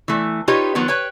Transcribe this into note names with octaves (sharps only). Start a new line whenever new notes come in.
E3 A3
D#4 F4 G4 B4 C#5 D#5
D#3 F3 F#3 B3
B4 C#5 G5